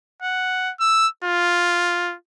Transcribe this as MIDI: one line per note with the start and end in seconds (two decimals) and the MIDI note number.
0.22 0.72 78
0.80 1.08 88
1.24 2.16 65